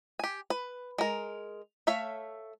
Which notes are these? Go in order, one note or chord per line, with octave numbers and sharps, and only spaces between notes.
G4 G#5
B4
G#3 A#4
A3 C#5 E5 F5